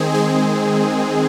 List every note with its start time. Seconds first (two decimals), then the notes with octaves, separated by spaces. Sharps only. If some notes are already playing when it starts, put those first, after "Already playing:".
Already playing: D#3 G#3 C4 G#4
0.14 G#3 G#4